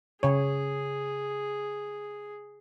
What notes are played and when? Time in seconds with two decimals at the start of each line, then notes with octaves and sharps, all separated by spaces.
0.23 C#3 G#4 C#5